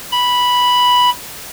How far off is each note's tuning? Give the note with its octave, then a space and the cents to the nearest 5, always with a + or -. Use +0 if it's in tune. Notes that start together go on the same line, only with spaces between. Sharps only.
B5 -5